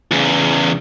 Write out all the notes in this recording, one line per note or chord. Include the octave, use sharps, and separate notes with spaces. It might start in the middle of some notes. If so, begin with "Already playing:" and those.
E2 C#3